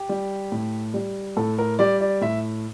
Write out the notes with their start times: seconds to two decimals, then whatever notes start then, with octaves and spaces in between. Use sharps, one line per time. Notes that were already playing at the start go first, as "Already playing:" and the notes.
Already playing: G4
0.09 G3
0.52 A2
0.94 G3
1.37 A2 A4
1.59 A#4
1.79 G3 D5
2.01 D5
2.21 A2 E5